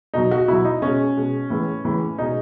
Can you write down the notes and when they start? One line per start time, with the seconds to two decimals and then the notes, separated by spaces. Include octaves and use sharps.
0.14 B2 F#3 D#4
0.31 F#4
0.48 B2 F#3 E4
0.65 D#4
0.82 B2 G#3 C#4
1.17 B2 G#3
1.50 A2 E3 G#3
1.85 A2 E3 G#3
2.18 B2 G#3 D#4